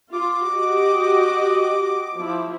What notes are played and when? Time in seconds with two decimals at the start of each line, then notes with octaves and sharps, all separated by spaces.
0.13 F4 D6
0.50 F#4 G4 D#5
2.16 F3 E4